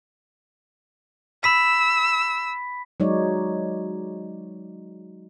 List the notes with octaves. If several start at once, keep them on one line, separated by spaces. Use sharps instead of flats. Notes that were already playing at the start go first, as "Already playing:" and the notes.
B5 E6 B6
F#3 G#3 D#4 C#5 D5